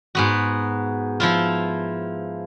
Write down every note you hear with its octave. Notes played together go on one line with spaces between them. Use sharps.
G#2 B3 F#4
F3 E4 F4